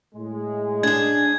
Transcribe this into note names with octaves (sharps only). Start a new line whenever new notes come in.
A2 G#3
D4 G#4 G#6